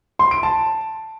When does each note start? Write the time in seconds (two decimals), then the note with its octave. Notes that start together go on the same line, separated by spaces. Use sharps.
0.19 C6
0.31 D7
0.43 A5